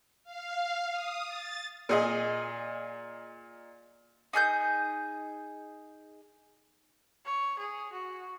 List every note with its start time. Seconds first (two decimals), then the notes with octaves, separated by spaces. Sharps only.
0.24 F5
0.91 D#6
1.25 A6
1.89 A#2 G#4 D#5
4.33 D#4 G#4 F#6 G6
7.25 C#5
7.59 G#4
7.93 F#4